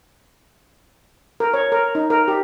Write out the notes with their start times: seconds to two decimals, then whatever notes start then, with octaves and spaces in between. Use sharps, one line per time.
1.40 A#4
1.54 C#5
1.72 A#4
1.95 D#4
2.10 A#4
2.28 G4